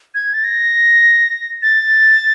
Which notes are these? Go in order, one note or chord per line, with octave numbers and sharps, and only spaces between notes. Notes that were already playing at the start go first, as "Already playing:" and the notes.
G#6
A6
A#6
A6